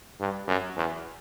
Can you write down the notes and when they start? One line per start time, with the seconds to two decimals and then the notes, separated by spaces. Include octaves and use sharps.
0.20 G2
0.48 F#2
0.76 E2